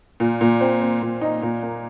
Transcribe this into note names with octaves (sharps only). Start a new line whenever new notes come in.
A#2
A#2
C4
C4
A#2
D#4
A#2
A#3